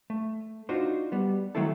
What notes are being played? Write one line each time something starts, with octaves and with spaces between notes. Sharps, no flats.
A3
D4 D#4 F4 F#4 C5
G3 B3
D#3 F#3 A3 C4 E4 A4